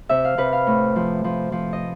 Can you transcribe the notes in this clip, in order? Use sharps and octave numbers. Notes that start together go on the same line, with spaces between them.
C3 E5
F5
C3 B4
F5
A2
F3
F3
F3
D#5